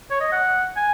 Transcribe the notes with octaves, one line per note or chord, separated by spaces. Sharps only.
C#5
D#5
F#5
G#5